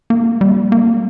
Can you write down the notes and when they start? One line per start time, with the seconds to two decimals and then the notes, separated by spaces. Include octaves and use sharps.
0.10 A#3
0.41 G3
0.72 A#3